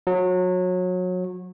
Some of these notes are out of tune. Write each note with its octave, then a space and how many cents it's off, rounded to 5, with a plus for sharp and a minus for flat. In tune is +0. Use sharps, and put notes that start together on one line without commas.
F#3 -25